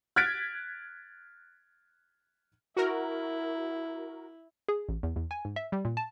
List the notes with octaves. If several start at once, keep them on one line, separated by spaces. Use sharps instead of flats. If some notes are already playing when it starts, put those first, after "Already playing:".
F6 F#6 G#6 A6 B6 D7
E4 F#4 A#4
G#4
A1
E2
E2
G#5
G#2
E5
G3
A#2
A5